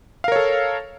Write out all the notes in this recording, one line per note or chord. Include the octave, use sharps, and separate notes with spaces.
A4 A#4 C#5 F5